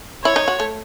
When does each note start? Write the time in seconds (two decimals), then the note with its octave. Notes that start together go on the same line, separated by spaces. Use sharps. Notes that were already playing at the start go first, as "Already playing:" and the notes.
0.24 E4 C#5
0.36 D#4
0.48 F#4
0.60 A3